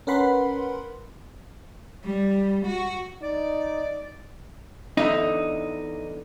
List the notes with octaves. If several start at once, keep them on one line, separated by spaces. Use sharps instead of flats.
C#4 A#4 B4 F#5 B5 C6
G3
F#4
D#4 D5
E2 D3 D#4 E5